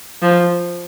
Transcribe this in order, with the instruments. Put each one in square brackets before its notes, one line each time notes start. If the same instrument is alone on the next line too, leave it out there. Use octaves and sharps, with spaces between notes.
[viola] F3